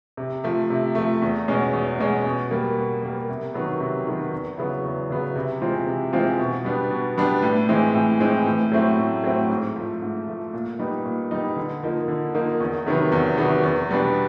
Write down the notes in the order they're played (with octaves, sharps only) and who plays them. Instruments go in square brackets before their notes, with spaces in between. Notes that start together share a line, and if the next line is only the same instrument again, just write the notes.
[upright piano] C3
F3 A3
C3
F3 A3
E2
B2 G#3 C#4
E2
B2 G#3 C#4
B2
G3 A#3
B2
G3 A#3
C3
D#3 F#3 B3
C3
D#3 F#3 B3
E2
C#3 F#3 B3 E4
E2
C#3 F#3 B3 E4
C3
E3 G#3 C4 F4
C3
E3 G#3 C4 F4
B2
G3 B3 D4
B2
G3 B3 D4
A2
E3 G#3 C4
A2
E3 G#3 C4
A2
F#3 A3 C4 E4
A2
F#3 A3 C4 E4
G#2
F3 A3
G#2
F3 A3
A#2
G3 B3 D#4
A#2
G3 B3 D#4
D3
F3 A#3 D#4
D3
F3 A#3 D#4
E2
C3 D#3 F#3 B3
E2
C3 D#3 F#3 B3
E2
B2 G3 B3 D4